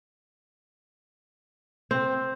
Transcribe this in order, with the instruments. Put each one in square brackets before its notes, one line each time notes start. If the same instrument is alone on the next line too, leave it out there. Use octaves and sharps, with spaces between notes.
[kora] C4